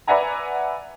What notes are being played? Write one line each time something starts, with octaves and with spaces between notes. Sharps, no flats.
B4 D5 E5 F#5 G#5 A#5